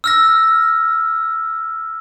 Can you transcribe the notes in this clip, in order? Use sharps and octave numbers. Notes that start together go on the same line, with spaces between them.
E6 F6 A#6